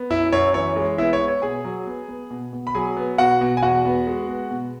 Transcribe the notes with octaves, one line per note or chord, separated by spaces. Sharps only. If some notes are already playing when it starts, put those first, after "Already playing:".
Already playing: B3
F#2 E4 E5
F#2 C#5
E3 C#5
G#3
B3 E4 E5
C#5
B3
C#5
B2 G#4 G#5
F#3
B3
B3
B2
B2
B5
F#3 G#4 G#5
B3
B2 F#4 F#5
B2
G#5
E2 F#4 F#5
B3
G#3
B3
B2